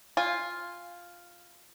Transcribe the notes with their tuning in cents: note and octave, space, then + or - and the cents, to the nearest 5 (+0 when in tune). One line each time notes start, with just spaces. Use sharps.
F4 +0 G#5 -25